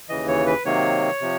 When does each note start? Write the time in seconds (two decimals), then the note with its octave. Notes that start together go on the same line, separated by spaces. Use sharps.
0.09 D#2 C#3 E3 D#5
0.28 C#5
0.46 B4
0.65 C3 D#3 F#3 A#3 C#5
1.21 C3 F3